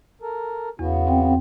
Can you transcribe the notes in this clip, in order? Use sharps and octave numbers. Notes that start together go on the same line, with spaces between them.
A4 A#4
E2 C#3 B3 F#4
C4 G5